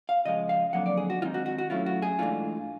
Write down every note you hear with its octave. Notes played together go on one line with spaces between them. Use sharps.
F5
C#3 F3 G#3 D#5
F5
F2 D3 F#3 A#3 F#5
D5
G#4
F#4
D#3 G#3 C4 D#4 F4
F#4
F#4
F#4
A2 F#3 A3 C#4 E4 F4
F#4
G#4
G#2 E3 A3 D4 F4